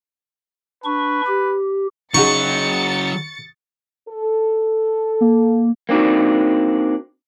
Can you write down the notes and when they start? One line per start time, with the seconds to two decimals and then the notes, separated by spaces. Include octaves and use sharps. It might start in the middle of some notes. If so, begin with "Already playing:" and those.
0.84 D4 B4 C#6
1.27 G4
2.14 C#3 F#3 D#4 F#4 G#4 C#6 A6 C#7
4.09 A4
5.21 A#3
5.89 A#3 C4 D4 D#4 F#4